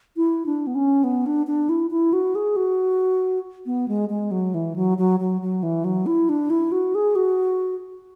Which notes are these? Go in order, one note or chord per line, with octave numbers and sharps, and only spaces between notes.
E4
D4
B3
C#4
B3
D4
D4
E4
E4
F#4
G#4
F#4
B3
G#3
G#3
F#3
E3
F#3
F#3
F#3
F#3
E3
F#3
E4
D4
E4
F#4
G#4
F#4